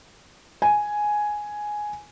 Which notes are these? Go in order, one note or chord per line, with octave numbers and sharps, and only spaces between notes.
G#5